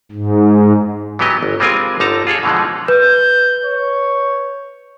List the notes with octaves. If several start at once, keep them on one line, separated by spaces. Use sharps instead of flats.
G#2
E3 F#3 B3 G4 D#5
G1
G3 G#3 C4 F4 A#4 G#5
G1 D3 D#4 A5 A#5
F4 G#4 A4 C#5
B2 D3 E3 F3 G#3
B4 G6
C#5